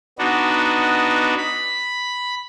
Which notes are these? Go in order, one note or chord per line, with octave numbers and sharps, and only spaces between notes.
B3 D4 D#4 F#4
B5